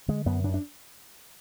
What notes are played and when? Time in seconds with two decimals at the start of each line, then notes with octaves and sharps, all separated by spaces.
0.08 D3 G#3
0.26 F#2 B3
0.44 F#2 D4
0.54 D4